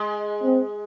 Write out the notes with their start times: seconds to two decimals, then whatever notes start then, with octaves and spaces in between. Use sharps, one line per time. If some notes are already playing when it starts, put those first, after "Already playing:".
Already playing: G#3
0.44 C4